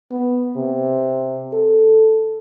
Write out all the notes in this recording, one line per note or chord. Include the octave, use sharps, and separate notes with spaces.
B3
C3
A4